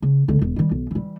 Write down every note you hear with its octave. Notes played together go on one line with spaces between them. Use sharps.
C#3
C#2 D3
E1
D#3 G3
B1
E3 G3